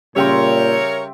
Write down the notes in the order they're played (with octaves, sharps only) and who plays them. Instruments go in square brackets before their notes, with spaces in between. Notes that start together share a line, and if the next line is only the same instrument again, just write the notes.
[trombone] A#2 [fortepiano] C#3 G3 [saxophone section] A#4 C#5 [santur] E5 G5 C6